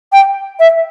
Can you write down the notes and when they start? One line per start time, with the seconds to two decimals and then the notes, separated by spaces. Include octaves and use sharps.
0.12 G5
0.59 E5